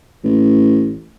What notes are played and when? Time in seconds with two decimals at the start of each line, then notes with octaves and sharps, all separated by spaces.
0.24 A1